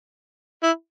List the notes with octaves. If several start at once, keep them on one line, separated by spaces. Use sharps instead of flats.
E4